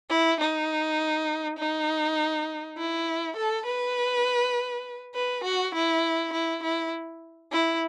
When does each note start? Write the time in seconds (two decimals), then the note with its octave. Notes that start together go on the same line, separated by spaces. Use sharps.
0.10 E4
0.41 D#4
1.59 D#4
2.78 E4
3.37 A4
3.66 B4
5.15 B4
5.44 F#4
5.74 E4
6.33 E4
6.63 E4
7.52 E4